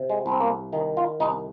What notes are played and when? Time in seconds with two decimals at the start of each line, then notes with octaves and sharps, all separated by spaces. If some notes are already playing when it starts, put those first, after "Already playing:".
Already playing: C3
0.10 G#3
0.26 C2
0.31 C4
0.41 A#3
0.73 D#3 D#4
0.97 F4
1.20 C2 D#4